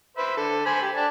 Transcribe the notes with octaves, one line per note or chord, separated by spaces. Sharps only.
B4 C5 E5
D3 A4
C5 G#5 B5
G4
D4 A5